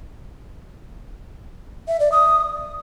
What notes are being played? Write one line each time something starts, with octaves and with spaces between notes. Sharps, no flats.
E5
D5
D#6